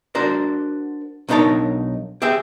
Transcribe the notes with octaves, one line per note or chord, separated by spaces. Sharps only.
D4 F#4 A#4 C5
B1 D4 D#4 A#4 C#5 A5
G4 G#4 E5 G5